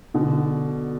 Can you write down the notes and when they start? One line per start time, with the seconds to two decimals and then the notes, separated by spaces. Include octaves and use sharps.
0.14 B2 D3